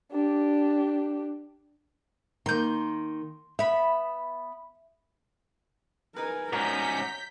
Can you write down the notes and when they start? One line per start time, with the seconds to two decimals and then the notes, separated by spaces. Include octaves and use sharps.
0.12 D4 G4
2.46 D#3 A#3 C6 G6
3.59 B3 E5 B5
6.16 D#4 G#4 A#4 B4 G#5
6.53 G#2 C#4 F#4 A#4 A#5 G6 B6